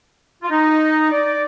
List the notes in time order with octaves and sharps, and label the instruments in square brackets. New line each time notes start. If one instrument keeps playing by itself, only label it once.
[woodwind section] F4
D#4
D5